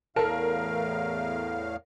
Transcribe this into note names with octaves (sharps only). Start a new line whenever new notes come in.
E2 A2 A4 A#4 F5 A5